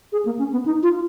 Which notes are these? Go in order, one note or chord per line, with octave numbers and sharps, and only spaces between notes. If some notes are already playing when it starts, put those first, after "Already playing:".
G#4
A#3
C#4
B3
D#4
F4